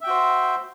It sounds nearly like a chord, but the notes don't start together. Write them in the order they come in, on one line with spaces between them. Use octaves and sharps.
E5 G5 F#4 C5